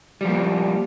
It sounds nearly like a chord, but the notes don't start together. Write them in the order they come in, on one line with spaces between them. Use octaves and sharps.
G3 F3 A#3